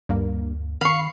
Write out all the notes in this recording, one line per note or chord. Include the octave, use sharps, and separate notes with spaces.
D2 G2 A#3
D#3 F5 B5 C#6 C7